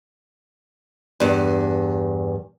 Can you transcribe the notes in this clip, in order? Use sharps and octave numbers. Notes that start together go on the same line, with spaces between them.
E2 G2